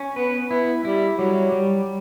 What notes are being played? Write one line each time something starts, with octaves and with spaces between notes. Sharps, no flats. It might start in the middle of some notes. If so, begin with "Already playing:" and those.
Already playing: C#4
B3 B4
B3 E4
G3 E4
F#3 G3
G3